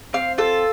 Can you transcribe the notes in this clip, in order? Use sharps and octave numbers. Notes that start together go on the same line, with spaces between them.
C4 F5
F4 A4